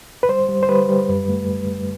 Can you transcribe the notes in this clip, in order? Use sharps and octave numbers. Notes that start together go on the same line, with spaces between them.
B4
G3 C5
G3
C5
G3 B4
G3
F#2
A3